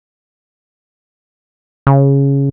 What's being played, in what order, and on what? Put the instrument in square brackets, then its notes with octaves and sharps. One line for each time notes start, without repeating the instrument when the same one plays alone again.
[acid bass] C#3